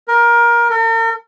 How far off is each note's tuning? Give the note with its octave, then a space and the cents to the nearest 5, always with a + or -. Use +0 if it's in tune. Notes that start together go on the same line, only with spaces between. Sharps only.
A#4 +20
A#4 -45